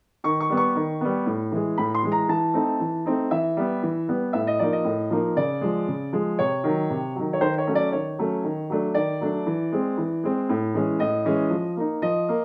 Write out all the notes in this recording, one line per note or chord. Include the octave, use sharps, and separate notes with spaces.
D#3 C#6
C#6
G3 B3
C#6
D#3
G3 B3
A2
E3 G#3
A2 B5
C6
E3 G#3
A#5
E3 A5
A3 C4 D#4
E3
A3 C4 D#4
E3 E5
G3 B3
E3
G3 B3
A2 E5
D#5
F3 A#3 D#4 D5
D#5
A2
F3 A#3 D#4
C#3 D5
F3 G#3
C#3
F3 G#3
C3 C#5
D#3 F#3
C3
D#3 F#3
C#5
D#3 C5
C#5
F#3 A3 C#4
D5
D#3 C#5
F#3 A3 C#4
D#3
F#3 A3 D4
D#3 D5
F#3 A3 D4
E3
G#3 C4
E3
G#3 C4
A2
E3 G#3 C#4
A2 D#5
E3 G#3 C#4
F3
A#3 D#4
F3 D#5
A#3